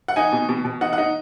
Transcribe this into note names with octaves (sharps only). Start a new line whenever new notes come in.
F#5
D#4 G#5
B2
B2
B2
D#4 F#5
F#5
D#4